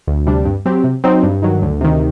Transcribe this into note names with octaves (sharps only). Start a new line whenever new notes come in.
D2
C3 G3 D4
G2
F#3 C4 G4
C3
F#3 C4 D#4
G2
D#3 F#3
D2
C3 D#3